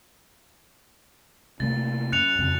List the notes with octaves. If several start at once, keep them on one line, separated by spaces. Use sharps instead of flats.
C3 A3 A#3 A6
F#2 F#6 C#7 F7
F2 C#3